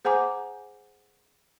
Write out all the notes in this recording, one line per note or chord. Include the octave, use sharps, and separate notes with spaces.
G#4 C5 F#5 G#5 A#5 D6